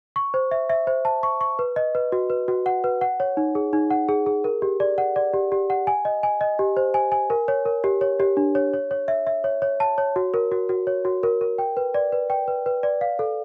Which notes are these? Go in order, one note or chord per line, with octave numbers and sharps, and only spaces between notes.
C#6
C5
E5
E5
C5
A5
C#6
C#6
B4
D#5
B4
F#4
B4
F#4
F#5
B4
F#5
C#5
D#4
G#4
D#4
F#5
G#4
G#4
A#4
G4
D5
F#5
D5
G4
G4
F#5
G#5
D#5
G#5
D#5
G4
C5
G#5
G#5
A#4
C#5
A#4
G4
C#5
G4
D4
C#5
C#5
C#5
E5
E5
C#5
C#5
A5
C#5
F#4
A#4
F#4
F#4
C#5
F#4
A#4
A#4
G5
B4
D5
B4
G5
B4
B4
D5
F5
A4